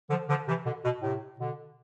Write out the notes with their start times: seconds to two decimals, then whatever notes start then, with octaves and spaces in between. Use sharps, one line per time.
0.10 D3 F3
0.29 D3 F3
0.48 C3 E3
0.65 B2 D3
0.84 B2
1.02 A2 C3
1.39 B2 D3